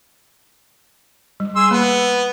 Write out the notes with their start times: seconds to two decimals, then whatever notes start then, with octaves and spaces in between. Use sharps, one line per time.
1.40 G3
1.56 G#4 C6 E6
1.71 A#3 B3 B5